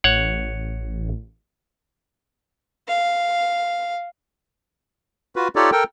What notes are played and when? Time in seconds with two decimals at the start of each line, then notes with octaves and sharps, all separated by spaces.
0.04 A1 C#5 F#5
2.87 F5
5.36 F4 F#4 B4
5.56 D#4 F4 G4 A4 C#5 D5
5.72 A4 A#4 G5